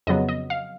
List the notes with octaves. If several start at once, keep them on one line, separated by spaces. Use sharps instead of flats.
F2 C#3 F#3 B3 D#5
D#5
F5